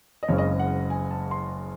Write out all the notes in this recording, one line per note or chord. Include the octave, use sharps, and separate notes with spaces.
D#5
F#1 F#2 C#3 G#3 C4 C#5
D#5
F#5
G#5
A5
C6